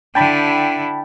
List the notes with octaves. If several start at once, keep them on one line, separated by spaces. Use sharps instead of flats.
D3 E4 G5 A5 B5